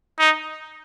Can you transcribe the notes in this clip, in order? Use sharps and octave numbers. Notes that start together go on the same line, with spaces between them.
D#4